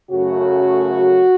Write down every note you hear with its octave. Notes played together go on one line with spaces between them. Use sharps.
F#2 C#3 A3 F#4